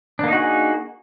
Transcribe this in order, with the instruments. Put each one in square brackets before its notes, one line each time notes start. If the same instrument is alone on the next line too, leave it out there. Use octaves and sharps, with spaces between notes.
[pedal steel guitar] D4
A#3
D#4
F#4
G#4